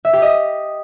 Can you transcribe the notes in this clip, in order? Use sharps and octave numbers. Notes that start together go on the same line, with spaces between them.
E5
G4
D#5